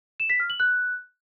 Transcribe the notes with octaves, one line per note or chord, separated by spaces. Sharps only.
E7
B6
F6
F#7
F#6